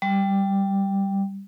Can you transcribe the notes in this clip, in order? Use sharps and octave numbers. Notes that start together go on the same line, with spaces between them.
G3